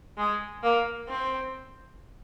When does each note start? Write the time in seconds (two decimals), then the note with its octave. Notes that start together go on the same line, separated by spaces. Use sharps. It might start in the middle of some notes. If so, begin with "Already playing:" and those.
0.18 G#3
0.63 A#3
1.09 C4